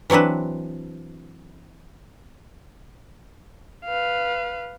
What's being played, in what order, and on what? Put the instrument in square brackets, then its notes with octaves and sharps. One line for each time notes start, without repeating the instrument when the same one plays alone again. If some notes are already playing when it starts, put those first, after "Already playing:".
[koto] E3 F#3 C4 D4 B4
[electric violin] B4 F5